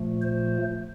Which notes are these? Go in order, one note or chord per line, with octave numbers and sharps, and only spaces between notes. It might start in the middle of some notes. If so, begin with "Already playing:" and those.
Already playing: A#2 F3 A3
C5